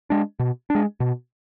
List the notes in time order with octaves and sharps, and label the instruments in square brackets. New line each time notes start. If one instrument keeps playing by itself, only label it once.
[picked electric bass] G#3 D4
B2
G#3 D4
B2